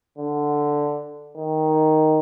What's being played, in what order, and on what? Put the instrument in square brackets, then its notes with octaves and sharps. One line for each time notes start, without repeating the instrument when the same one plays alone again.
[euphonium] D3
D#3